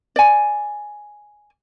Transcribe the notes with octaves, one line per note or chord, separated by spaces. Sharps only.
D5 G#5